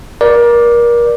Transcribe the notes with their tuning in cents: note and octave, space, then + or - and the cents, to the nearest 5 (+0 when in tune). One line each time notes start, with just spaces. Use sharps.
A#4 +30 D5 +0